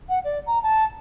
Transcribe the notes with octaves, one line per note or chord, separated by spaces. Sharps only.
F#5
D5
A#5
A5